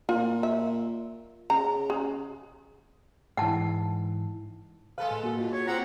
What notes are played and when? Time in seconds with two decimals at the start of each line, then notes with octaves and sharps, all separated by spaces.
0.09 A#2 F4
0.43 E5
1.50 C#3 A#5
1.90 G#4
3.37 G#2 E3 F#5 A5
4.98 G#3 A4 B4 F5
5.11 A2
5.24 A#3 F#4
5.38 G2 F4
5.53 B3 C#5
5.67 C4 G4 F#5 A#5